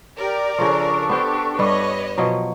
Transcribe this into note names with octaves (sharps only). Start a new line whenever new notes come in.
G4 A#4 D5
C#3 F3 D4 A4 C#6
B3 G4 C5
G2 G3 B4 C#5 D#5
B2 F3 F#3